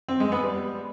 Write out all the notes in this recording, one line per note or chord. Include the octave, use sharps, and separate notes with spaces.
C4
G#3
B3
G3